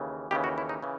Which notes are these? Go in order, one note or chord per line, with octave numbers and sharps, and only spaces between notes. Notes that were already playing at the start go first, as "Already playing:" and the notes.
Already playing: D#2 C#3 E3
D#2 C#3 E3 G4
F#4
E4
D#4
C#3 E3